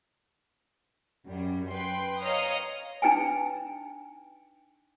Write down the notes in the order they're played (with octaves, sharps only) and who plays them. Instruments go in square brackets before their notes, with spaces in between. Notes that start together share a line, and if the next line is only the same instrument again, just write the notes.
[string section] F#2 G3
B4 G5 C6
C#5 D#5 F5 A#5 D#6
[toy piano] D4 D#4 B4 G5 G#5